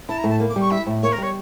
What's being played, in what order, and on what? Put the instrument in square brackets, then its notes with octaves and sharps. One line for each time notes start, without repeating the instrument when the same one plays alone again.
[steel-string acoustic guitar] E4 [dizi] A5
[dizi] A#5
[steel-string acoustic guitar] A2
[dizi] A5
[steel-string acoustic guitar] A#3
[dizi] D6
[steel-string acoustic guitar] G3 [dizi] C#6
[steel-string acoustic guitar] E4 [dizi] E5
[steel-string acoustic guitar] A2
[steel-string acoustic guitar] A#3 [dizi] C#5
[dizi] A#4
[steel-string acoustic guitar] G3 [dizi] C#5